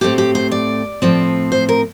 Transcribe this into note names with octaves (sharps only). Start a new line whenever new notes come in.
A2 A3 C4 G4
G4
C5
D5
A2 F3 C4
C5
A#4